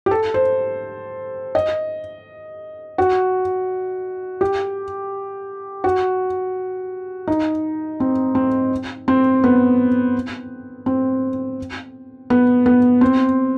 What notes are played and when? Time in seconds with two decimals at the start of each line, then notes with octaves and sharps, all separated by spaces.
0.06 G4
0.11 A4
0.34 C5
1.55 D#5
2.98 F#4
4.41 G4
5.84 F#4
7.27 D#4
8.00 C4
8.35 C4
9.08 C4
9.44 B3
10.86 C4
12.30 B3
12.66 B3
13.01 C4